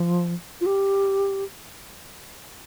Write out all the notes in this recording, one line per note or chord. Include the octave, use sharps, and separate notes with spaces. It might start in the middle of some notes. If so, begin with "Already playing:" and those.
Already playing: F3
F4
G4